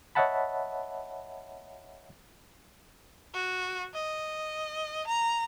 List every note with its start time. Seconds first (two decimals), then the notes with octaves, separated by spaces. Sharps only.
0.15 C#5 D#5 E5 F#5 A5 B5
3.34 F#4
3.94 D#5
5.07 A#5